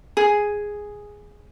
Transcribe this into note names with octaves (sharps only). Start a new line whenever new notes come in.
G#4